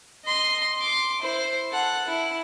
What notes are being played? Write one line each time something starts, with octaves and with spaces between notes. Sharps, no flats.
D#5 C6
C6 D6
E4 C5
A4 F#5
E4